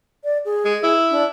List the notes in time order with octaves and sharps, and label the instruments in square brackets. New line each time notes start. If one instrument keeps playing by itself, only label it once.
[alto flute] D5
G#4
[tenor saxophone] G#3
E4
[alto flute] D4